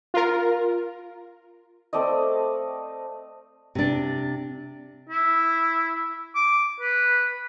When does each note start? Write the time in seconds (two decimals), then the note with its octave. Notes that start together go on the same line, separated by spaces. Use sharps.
0.14 F4 A#4
1.93 A3 C4 D5 D#5
3.75 C3 D4
5.09 E4
6.35 D6
6.80 B4